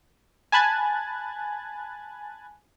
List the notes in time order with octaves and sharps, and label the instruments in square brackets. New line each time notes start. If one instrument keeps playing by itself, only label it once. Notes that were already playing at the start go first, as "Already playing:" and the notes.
[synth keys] G#5 A5 B5 F#6 G#6 A6